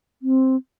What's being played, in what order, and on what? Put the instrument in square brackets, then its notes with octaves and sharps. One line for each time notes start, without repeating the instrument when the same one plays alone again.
[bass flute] C4